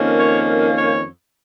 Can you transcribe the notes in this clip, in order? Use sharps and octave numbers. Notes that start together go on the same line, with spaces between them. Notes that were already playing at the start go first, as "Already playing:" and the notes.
Already playing: F2 D#3 A#3 C#4
C#5
C#5